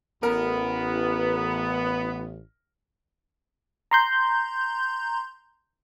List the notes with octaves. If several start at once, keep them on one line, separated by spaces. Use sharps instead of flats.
A1 B3 A#4
A#5 C6 G6